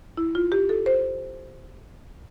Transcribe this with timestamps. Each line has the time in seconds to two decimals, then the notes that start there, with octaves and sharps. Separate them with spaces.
0.17 E4
0.35 F4
0.52 G4
0.69 A4
0.86 C5